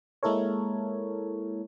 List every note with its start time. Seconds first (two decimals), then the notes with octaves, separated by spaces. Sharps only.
0.23 G#3 A#3 E4 A4 A#4 C#5